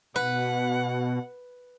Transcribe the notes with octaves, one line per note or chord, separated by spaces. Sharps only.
B2 B4 F#5